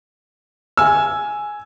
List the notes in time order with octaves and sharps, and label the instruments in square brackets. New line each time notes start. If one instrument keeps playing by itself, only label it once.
[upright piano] G#5 E6